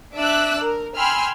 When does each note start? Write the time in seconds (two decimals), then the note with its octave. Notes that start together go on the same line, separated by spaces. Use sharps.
0.15 D4 E5 D6 E6 F#6
0.61 A#4
0.96 G5 G#5 B5 C6 E6 F6